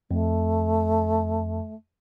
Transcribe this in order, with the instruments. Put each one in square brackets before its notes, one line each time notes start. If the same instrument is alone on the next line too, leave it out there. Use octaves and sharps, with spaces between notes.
[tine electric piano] F2 [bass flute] A3